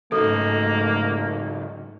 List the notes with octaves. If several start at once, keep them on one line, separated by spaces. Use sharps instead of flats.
G#2 C#3 F#3 A3 A#3 D#4 A4